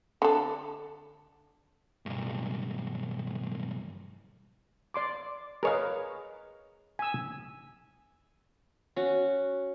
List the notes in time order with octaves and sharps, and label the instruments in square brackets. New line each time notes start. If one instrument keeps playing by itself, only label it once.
[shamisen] D3 A4
[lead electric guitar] B1 G2
[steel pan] D5 C6 D6
[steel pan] G#4 B4 D#5 [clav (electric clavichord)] A#4 C#5 F5
[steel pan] G#5 E6
[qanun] C#4 F#4